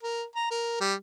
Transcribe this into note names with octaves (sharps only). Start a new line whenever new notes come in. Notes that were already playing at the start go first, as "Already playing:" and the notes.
A#4
A#5
A#4
G3